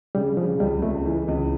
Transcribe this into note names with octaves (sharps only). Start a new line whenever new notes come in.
C#3 G3
C#3 F3
C#2 G3
C#2 A3
E3
C#2